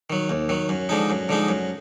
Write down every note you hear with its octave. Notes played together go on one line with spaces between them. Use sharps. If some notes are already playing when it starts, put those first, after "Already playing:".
D#3 F#3
D#2
D#3 F#3
F#2
D3 F3 G#3 D#4
F#2
D3 F3 G#3 D#4
F#2